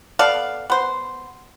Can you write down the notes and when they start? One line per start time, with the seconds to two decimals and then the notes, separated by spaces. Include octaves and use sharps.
0.19 B3 A4 D5 F5
0.70 B3 C5